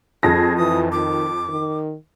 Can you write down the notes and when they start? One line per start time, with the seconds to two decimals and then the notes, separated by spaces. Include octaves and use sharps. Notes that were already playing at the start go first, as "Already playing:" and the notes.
0.23 F2 G#4 A#6
0.57 E3 D#6
0.92 D#3 D6
1.49 D#3